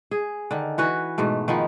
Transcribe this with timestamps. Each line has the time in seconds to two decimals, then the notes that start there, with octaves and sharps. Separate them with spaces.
0.11 G#4
0.51 D3 D#3
0.78 E3 F#4 B4
1.18 G#2 B2 A3
1.48 D#3 F3 B3